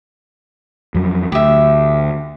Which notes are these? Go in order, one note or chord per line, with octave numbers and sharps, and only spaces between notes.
F2 F#3
D2 G4 E5